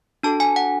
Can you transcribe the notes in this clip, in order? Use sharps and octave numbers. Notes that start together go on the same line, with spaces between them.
D4 F#4 A4 A5
G#5
F#5